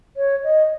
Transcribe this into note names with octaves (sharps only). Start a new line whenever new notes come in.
C#5
D#5